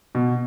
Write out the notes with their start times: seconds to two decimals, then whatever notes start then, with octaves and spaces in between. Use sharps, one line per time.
0.15 B2